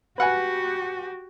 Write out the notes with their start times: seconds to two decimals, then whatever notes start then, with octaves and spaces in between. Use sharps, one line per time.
0.18 F#4 G4 B4 F#5 G#5